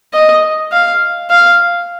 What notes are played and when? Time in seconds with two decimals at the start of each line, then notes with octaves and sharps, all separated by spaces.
0.14 D#5
0.72 F5
1.30 F5